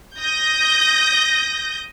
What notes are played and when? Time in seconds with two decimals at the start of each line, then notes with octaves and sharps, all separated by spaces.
0.19 D#6 G6 A#6